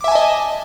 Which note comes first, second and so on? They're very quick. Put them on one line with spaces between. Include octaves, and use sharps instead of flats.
D6 E5 G#5 A5 D#5